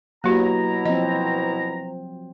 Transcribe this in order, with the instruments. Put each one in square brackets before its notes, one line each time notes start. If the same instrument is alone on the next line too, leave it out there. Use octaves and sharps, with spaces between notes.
[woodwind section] B2 E4 A#5 [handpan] F#3 [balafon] A#3 F#4 G4
[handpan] F3 C4 [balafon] D#5